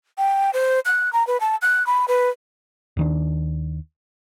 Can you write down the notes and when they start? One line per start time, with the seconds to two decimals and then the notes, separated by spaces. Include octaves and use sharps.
0.18 G5
0.53 C5
0.85 F#6
1.13 A#5
1.27 B4
1.40 A5
1.62 F#6
1.87 B5
2.08 B4
2.97 D#2 D#3 D4